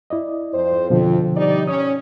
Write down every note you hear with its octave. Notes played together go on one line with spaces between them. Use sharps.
E4 D5 D#5
F2 C5
F2 B2 D3 F3
G3 D#4 D5
C#4 D#6